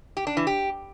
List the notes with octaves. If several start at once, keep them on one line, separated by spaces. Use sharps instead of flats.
G4
D4
E3
G4